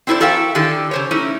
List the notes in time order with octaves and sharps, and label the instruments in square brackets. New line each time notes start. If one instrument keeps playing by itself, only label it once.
[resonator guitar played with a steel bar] C4 D4 E4 G#4 A4 C5
F#4 A4 A#4 E5 F5 G5
D3 D#3 E4 G4 A4
C#3 C5 C#5
A3 C#4 D#4 E4